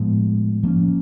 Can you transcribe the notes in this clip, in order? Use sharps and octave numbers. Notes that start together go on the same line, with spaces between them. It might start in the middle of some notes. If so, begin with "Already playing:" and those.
Already playing: A2 F3 G#3 B3
F3 A#3 C#4